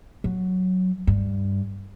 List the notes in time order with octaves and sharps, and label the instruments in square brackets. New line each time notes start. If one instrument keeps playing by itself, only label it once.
[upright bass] F#3
G2